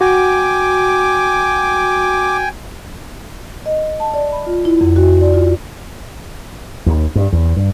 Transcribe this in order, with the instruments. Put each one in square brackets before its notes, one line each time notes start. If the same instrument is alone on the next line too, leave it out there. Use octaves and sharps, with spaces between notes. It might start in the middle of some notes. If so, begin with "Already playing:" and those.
[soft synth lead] F#4 [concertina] G5 G#5 [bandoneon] D6
[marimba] D#5
A5
D5
B5
F4
E4
F2
F#4
D5
F4
[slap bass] D#2
G2
E2
G2